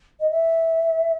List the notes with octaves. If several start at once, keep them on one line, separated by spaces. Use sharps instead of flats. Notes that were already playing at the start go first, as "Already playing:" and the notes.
D#5
E5